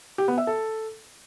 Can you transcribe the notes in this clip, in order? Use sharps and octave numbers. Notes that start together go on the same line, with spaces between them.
G4
B3
E5
A4